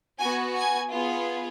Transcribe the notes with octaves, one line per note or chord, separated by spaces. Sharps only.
B3 F#4 G#5
G#5
B3 F4 G#4